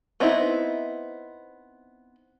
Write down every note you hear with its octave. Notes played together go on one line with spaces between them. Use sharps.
B3 C4 D#4 E4